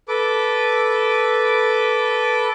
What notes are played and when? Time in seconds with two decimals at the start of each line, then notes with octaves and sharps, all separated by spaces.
0.08 A4 B4 D6